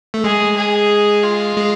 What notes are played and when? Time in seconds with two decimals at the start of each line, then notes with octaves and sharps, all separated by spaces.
0.14 A3
0.24 G#3 G#4
0.56 G#4
1.23 F4
1.57 G#3